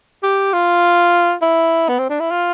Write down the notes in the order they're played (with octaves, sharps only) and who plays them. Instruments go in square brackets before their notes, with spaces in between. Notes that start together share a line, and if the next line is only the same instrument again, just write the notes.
[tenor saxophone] G4
F4
E4
B3
C4
D4
E4
F4